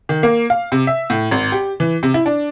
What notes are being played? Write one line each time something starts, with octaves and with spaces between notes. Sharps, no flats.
D#3
A#3
F5
C3
E5
A2
G#1
G4
E3
C3
E4
D4